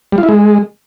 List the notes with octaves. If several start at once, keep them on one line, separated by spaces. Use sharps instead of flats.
G3
F4
E4
G#3